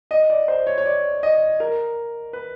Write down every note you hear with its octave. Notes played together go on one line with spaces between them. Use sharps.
D#5
D5
C5
C#5
C#5
D5
D#5
A#4
B4